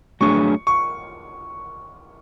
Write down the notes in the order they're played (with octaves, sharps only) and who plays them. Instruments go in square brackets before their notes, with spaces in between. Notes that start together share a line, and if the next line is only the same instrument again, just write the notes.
[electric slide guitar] F#3 A3 D4 G#4 C#5 [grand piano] C#6
[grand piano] C#6